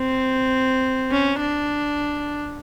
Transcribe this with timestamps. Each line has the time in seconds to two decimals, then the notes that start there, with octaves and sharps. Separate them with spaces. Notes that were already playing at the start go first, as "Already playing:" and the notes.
Already playing: C4
1.11 C#4
1.41 D4